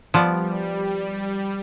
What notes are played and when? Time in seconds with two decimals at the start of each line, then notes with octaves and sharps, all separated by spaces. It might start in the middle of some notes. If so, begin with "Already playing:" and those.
0.14 F3 G3 B3 D5